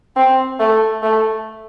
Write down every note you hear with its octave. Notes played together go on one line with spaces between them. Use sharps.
C4
A3
A3